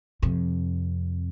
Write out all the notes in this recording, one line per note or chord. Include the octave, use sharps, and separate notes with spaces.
F2 C3